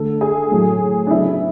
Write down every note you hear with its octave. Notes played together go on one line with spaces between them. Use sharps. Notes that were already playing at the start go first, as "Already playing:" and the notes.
Already playing: D3 A3 A4
G#4
A2 F#3 A3
D4
C#3 F#3 B3 E4